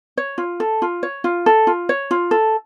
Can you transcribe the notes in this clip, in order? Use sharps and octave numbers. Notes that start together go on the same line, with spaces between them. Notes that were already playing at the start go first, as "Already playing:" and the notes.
C#5
F4
A4
F4
C#5
F4
A4
F4
C#5
F4
A4